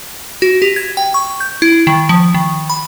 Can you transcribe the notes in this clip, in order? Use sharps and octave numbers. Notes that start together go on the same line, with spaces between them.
F#4
G4
G#6
G5
C#6
G6
E4
D#3
F3
D#3
B5